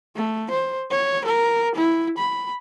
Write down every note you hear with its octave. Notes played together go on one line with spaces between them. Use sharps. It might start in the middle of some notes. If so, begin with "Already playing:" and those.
A3
C5
C#5
A#4
E4
B5